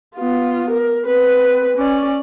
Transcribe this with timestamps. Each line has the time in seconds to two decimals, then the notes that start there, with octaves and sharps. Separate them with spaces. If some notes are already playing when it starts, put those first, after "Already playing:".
0.16 B3 F4
0.70 A#4
1.06 C4 B4
1.77 C#4 D5